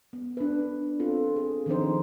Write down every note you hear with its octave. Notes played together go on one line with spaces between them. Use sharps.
B3
D4 B4
C4 F4 A4
G#4
D#3 F3 C4 D4 D#4 C5